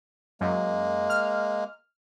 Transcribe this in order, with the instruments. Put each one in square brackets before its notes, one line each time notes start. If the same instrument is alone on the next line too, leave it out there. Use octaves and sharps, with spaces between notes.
[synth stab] F#2 [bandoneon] G#3 A#3
[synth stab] F6